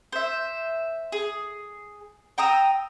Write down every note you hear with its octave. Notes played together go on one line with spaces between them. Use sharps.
C5 E5
G#4
G5 A#5 D#6 E6